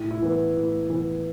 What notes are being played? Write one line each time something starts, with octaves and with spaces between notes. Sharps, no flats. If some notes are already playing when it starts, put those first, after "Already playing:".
Already playing: A2
E4
E3 B3
A2
E3 B3